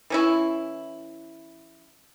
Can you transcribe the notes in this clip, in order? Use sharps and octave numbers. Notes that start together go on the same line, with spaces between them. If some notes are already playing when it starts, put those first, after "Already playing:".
E3 C#4 E4